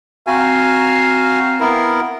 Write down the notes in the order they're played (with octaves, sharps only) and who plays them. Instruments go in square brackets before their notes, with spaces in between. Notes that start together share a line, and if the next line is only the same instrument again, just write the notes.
[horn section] C4 F5 A#5 [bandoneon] F#4 G#5
[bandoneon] B3 E4 A#4